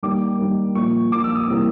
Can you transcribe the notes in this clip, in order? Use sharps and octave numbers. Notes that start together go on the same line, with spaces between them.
D#3 G3 A#3 D6
D#3 G3 A#3
A#2 F3 A#3 C#6
A#2 F3 A#3 D6
E6
D#6
C3 E3 G3 A#3 E6